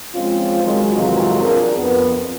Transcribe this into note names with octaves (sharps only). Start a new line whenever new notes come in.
F3 G#3 C4 C#4 F4
D#3 F#3 G#3
F2 G#2 C3 E3 F#3 F4
D4 G#4 A#4
F2 B3